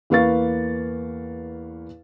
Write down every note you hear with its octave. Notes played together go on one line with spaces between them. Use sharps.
E2 A#3 B4 F5 C#6 A6